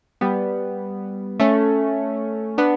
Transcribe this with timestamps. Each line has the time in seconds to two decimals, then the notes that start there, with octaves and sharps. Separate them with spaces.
0.21 G3 B3
1.40 A3 C#4
2.58 B3 D4